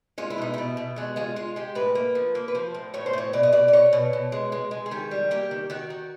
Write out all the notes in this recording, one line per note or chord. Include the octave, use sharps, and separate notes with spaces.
G#3 F4
E4
B2 D#4
B2 E4
B2
G#3 F#4
G#3 F4
G#3 F4
G#3 G4
A2 B4
A#3
F3
A#3
B4
F3 C5
A2
A2 C#5
C5
A2 C#5
B2 D5
D#5
B2 D5
D5
B2 C#5
B2
B2
G#3
G#3
G#3
G#4
D#3 G4
G3
A#3 G4
D#3
D#3 F#4
D#3